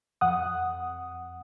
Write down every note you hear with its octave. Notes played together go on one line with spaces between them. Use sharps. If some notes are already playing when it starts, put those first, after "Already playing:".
F2 F#5 D#6